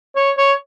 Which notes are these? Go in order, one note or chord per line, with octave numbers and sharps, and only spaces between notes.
C#5
C#5